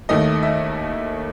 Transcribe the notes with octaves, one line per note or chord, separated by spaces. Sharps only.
D#2 D#3 A3 D#5
E5
D#5